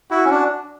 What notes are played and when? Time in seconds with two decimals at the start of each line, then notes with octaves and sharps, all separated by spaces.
0.10 E4 F#4
0.25 C#4
0.30 D4